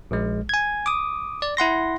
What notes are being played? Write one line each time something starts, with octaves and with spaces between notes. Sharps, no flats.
A#1 G#3
G#5 G#6
D6 D#6
D5
E4 F#5 C6 A#6